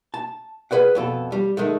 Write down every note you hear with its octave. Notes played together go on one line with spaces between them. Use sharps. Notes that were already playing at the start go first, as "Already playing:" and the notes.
A5
G#4 B4 D5 F#5
F2 B2 A4
G3
D#3 G#3 A3